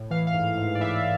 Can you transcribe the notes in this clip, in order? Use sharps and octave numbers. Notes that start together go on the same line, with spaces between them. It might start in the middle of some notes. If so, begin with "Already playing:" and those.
Already playing: A2
E3 F5
F5
G#2
G#2
D5
E3 E5